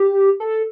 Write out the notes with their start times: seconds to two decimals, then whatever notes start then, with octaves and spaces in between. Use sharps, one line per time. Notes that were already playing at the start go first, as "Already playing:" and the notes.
Already playing: G4
0.40 A4